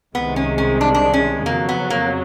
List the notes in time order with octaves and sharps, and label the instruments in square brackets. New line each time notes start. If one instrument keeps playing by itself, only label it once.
[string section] C2 C3 D#3 G#3 [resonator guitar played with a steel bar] B3
[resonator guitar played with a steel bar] C#4
C#4
D4
D4
C#4
[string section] F2 C#3 F#3 [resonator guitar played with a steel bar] A#3
[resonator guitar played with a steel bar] B3
A#3